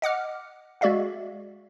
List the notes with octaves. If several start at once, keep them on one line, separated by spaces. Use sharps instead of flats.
D#5 F#5 D6 F6
G#3 F#4 D5 E5 F5